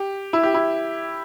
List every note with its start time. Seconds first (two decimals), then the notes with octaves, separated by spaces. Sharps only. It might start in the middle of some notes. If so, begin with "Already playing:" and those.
Already playing: G4
0.33 E4
0.43 G4
0.54 E4